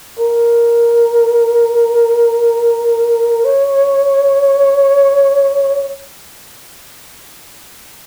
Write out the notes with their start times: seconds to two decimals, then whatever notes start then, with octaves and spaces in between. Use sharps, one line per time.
0.19 A#4
3.45 C#5